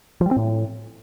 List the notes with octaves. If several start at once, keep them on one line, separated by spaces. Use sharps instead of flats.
F3
G3
C4
A2